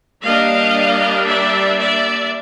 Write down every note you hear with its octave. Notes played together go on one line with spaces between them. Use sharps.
G3 A#3 D4 D#5 F5
D5 E5
D5 E5